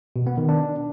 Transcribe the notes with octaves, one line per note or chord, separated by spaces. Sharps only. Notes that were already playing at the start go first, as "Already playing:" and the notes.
B2
B3
D#3
D4